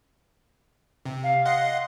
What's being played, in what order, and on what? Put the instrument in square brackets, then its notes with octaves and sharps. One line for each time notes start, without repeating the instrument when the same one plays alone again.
[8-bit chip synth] C3
[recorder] F5
[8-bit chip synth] D#5 F#5 C6